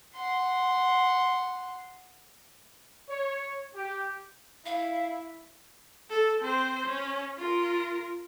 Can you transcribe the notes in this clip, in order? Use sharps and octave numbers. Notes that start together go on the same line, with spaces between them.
F#5 C6
C#5
G4
E4 F5
A4
C4 C5
C#4
F4 A#4